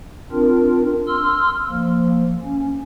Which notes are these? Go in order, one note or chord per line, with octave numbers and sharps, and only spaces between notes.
C4 D4 F4 A#4
C6 E6 F6
F3 A#3
C#4